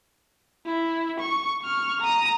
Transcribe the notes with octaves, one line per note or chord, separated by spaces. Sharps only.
E4
C#6
C#6 F6
A#5 D#6